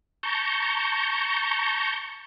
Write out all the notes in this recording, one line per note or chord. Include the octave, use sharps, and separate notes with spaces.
A5 A#5 C#6 G6